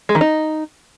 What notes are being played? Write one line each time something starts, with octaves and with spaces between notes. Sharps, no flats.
G#3
D#3
D#4